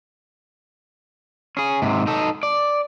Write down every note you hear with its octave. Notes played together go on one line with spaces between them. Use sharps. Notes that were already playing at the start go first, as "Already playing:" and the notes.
C#4 G#4
G#2 C3
D#4 A4
D5